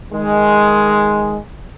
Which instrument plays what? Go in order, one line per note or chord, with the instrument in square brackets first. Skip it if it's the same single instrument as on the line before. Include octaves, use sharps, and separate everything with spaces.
[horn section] D#3 G#3